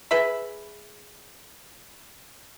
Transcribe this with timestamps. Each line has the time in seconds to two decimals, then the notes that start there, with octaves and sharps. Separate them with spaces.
0.11 G#4 B4 E5 B5